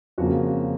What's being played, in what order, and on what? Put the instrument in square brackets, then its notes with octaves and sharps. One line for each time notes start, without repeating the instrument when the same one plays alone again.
[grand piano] F2 C#3 F3 A#3 F#4